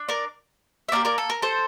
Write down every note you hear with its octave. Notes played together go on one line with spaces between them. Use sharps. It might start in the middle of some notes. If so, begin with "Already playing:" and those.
Already playing: D4
A#4 D5
E5
A#3 D4 G4 A#4 D5
A#4 D5
A4
A#4
A4 C5